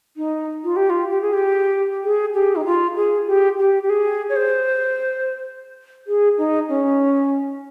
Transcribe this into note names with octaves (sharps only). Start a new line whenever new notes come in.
D#4
F4
G4
F4
G4
G#4
G4
G#4
G4
D#4
F4
G#4
G4
G4
G4
G#4
C#5
C5
G#4
D#4
C#4